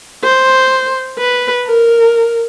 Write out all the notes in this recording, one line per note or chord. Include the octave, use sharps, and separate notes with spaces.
C5
B4
A#4